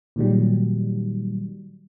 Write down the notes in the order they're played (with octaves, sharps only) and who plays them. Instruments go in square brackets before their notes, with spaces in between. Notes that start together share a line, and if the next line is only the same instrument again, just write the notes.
[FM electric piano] A#2 D#3 F#3 G3